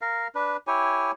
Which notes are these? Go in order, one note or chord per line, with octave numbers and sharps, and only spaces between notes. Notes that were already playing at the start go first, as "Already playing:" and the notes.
A#4 F5
D4 B4
E4 G4 C#5 G#5